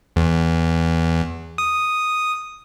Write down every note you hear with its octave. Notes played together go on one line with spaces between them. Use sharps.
E2
D#6